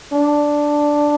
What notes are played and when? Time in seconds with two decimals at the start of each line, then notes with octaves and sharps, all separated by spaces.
0.12 D4